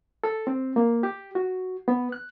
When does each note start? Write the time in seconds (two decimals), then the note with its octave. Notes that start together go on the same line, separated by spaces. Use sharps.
0.24 A4
0.47 C4
0.76 A#3
1.03 G4
1.35 F#4
1.88 B3
2.12 F#6